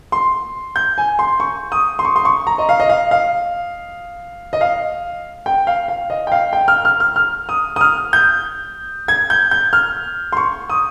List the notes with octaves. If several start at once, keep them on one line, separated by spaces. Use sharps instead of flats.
C6
G6
G#5
C6
C#6
D#6
C6
C#6
C6
C#6
A#5
D#5
F5
D#5
F5
F5
D#5
F5
G5
F5
F5
D#5
G5
F5
G5
F6
F6
F6
F6
D#6
D#6
F6
G6
G#6
G6
G6
F6
C6
C#6
D#6